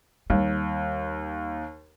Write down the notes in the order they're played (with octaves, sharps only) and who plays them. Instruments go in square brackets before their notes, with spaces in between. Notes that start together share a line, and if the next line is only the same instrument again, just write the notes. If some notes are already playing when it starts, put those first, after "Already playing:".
[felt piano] D#2 [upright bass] G3